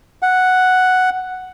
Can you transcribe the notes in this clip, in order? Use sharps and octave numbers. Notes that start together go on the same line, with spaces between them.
F#5